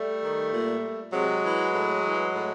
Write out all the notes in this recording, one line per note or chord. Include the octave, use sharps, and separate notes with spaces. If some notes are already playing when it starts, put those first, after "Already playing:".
Already playing: G3 A3
D#3
A#2
C3 F#3 G#3
E3
A2
E3
A2